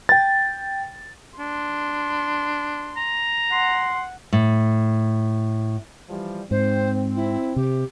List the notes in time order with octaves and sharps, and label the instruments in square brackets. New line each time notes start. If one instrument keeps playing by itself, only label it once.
[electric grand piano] G5 A6
[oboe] D4 [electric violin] C6
[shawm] A#5
[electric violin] F#5 [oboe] C6
[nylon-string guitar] A2
[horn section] E3 F3 G3
[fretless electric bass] G#2 [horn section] C4 [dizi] C5
[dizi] E4
[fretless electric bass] C3 [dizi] G4